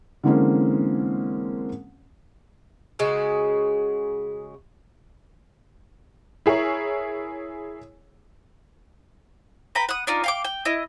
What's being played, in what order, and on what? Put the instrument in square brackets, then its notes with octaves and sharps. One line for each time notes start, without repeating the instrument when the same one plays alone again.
[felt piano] D3 E3 G#3 A#3 C4 C#4
[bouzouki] C#3 G#3 F#4
[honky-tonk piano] E4 G#4 A#4 C#5
[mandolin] B4 G5 A#5 B5
F#5 D#6
D4 D#4 F4
F5 G5 D6
G5
E4 D#5